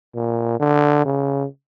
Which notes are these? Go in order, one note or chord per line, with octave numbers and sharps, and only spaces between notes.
A#2
D3
C#3